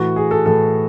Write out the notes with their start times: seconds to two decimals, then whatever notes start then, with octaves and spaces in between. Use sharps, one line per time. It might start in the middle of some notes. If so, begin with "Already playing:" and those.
Already playing: A2 E3 F#4
0.16 G#4
0.31 A4
0.46 A2 E3 A4